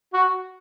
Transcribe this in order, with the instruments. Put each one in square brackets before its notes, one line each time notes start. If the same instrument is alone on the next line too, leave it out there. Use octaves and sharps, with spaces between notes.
[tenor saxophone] F#4